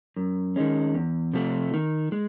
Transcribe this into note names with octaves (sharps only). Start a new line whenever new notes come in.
F#2
D#3 G#3 C#4
E2
C3 F3 A3
D#3
G#3